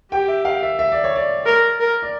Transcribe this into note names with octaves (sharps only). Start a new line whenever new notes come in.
G4 G5
E5
F5
E5
E5
D5
C#5
D5
A#4
A#4
D5